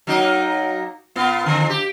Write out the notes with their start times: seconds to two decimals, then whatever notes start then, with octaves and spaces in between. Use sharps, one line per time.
0.07 F#3 A#3 D#4
1.16 A#2 B3 F4
1.46 F2 D3
1.70 G4